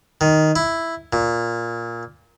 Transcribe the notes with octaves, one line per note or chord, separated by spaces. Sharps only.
D#3
E4
A#2